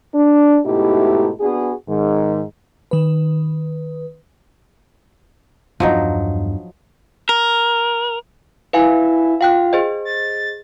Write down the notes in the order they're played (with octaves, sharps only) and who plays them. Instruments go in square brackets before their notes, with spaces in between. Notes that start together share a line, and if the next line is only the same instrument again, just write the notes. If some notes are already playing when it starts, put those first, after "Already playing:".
[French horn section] D4
G#2 B2 A3 D#4 E4 G4
B3 D4 F#4 G#4
G#2 D#3
[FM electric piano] D#3 B4
[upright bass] E2 G2 [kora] F3 F#3 D#4
[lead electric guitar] A#4
[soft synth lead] E4 [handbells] B4 F5 G#5
[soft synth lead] F4 [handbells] F5 G5 F#6
[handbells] G#4 C5 D#5
[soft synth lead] A6